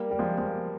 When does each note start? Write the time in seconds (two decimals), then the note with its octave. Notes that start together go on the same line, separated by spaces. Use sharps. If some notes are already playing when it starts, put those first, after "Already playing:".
Already playing: G3 A#3
0.11 G3
0.19 F3 G#3
0.38 F3 G#3